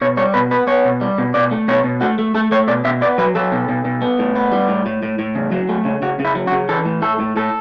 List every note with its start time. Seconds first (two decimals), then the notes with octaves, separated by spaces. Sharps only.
0.01 B2 C#5
0.17 G3 C#5
0.34 B2 B4
0.51 B3 B4
0.67 B3 C#5
0.85 B2
1.01 G3
1.18 B2
1.34 B2 D5
1.51 A3
1.68 B2 C#5
1.84 B2
2.01 A3 F#4
2.19 A3
2.35 A3 A4
2.52 A3 C#5
2.68 B2 D5
2.85 B2 E5
3.01 B3 D5
3.18 F#3 B4
3.35 F#3 A4
3.52 B2
3.69 B2
3.85 B2
4.02 B3
4.19 A2
4.36 B3
4.52 G3
4.68 A2
4.86 A2
5.03 A2
5.19 A2
5.35 C#3
5.52 F#3
5.69 A3
5.85 C#3
6.02 C#3 F#4
6.20 C#3 E4
6.35 F#3
6.47 F#4
6.52 C#3
6.69 E3 A4
6.85 A2
7.02 A3 A4
7.20 A2
7.36 A2 A4